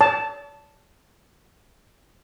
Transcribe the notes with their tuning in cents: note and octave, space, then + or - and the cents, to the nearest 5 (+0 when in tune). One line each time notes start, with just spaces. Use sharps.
D5 -45 A5 +0